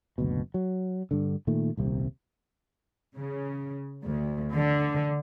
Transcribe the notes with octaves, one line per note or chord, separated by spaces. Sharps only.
F#1 D2 B2
F#3
G2 D3
A#2 D#3 A3
D#1 C2 C3
C#3
D2
D3